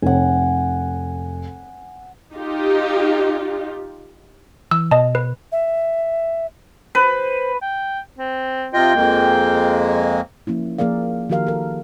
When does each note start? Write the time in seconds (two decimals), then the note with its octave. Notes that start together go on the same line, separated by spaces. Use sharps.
0.02 F1 F#5 G#5
2.33 D#4 F4 G4
4.71 E3 E6
4.91 B2 D#5 A5
5.15 B4
5.52 E5
6.95 B4 C5
7.62 G5
8.19 C4
8.74 C3 F4 D#5 G5
8.95 F2 G#3 A#3
10.47 F3 A#3 C#4 E4
10.79 F3 A#3 G#4 A#4 D5 F5
11.29 D#3 F3 F#4 G4 A#4 F5
11.47 A4 A#4